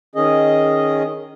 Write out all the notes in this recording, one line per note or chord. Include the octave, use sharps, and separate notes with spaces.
D#3 C#4 G#4 D#5